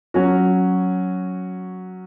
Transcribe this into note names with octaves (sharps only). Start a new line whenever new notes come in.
F#3 C#4 F#4